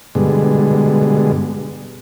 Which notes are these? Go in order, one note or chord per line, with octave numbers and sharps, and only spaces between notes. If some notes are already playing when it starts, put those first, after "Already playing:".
G2 B2 D3 G#3